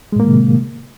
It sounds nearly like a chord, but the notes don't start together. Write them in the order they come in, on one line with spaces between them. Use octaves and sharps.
G#3 A2 A#3 D#3 C3